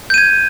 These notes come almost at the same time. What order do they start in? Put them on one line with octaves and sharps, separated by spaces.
G6 D#7 G#6